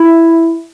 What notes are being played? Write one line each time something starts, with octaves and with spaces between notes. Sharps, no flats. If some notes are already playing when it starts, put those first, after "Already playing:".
Already playing: E4